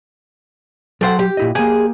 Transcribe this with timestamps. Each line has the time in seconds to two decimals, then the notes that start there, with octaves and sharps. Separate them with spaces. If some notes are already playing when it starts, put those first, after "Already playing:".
1.01 F#3 A4 C5 F#5 G5 C6
1.19 G4
1.37 A#2 E4 D#5
1.55 A#3 G4 G#4